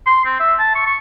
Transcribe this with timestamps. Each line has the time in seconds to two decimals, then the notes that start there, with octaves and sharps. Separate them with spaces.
0.06 C6
0.25 C4
0.40 E5
0.59 A5
0.75 C#6
0.86 C#6